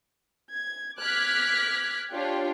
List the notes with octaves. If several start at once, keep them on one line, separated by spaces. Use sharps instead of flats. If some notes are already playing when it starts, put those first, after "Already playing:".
G#6
D6 F6 F#6 G#6 B6
D4 F4 G4 C#5 G5